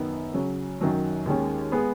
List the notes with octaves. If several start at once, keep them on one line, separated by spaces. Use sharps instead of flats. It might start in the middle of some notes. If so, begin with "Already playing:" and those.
Already playing: F#2 D#3 B3 D#4
C#3 F#3 C#4
F#2 D#3 F#3 C#4
D#2 D#3 G#3 C#4
G#3 B3 G#4